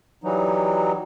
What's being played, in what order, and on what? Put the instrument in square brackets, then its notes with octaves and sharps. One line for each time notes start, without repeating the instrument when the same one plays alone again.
[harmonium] E3 F#3 G3 D#4